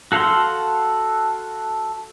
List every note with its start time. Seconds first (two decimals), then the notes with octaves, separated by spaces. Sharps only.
0.12 F#4 A4 F5 F#5 C6